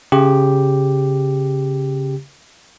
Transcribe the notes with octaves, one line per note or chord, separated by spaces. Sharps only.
C#3 G4